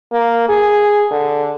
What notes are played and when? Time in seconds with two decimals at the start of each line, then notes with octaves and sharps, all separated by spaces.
0.12 A#3
0.49 G#4
1.11 D3